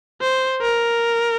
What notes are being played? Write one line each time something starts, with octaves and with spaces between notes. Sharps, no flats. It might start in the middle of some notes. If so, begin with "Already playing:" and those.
C5
A#4